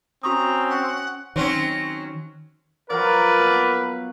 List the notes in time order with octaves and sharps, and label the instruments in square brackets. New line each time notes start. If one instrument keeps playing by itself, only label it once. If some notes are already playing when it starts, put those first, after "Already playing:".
[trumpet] C4 [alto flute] C#4 [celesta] F#4 C#6 D#6 [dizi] A#5
[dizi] F#5
[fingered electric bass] D#3 [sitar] F#3 C4 C#4
[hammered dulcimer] F3 F#3 [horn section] A#4 [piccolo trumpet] B4 [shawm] D5
[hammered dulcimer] B2